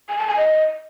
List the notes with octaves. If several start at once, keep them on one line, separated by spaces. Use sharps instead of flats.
G#5
A5
G#5
D#5